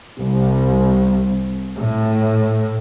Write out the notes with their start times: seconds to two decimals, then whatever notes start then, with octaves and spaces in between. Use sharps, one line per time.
0.19 C2
1.77 A2